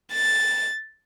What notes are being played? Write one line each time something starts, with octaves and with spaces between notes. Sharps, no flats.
A6